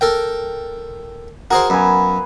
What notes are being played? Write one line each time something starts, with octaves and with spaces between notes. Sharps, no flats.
A4 A#4 G5
F#4 G#4 A#4 C5
F#2 B3 F5 G#5